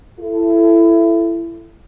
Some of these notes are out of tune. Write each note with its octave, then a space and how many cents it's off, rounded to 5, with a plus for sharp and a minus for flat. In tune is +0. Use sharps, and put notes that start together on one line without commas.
E4 +25 A4 +0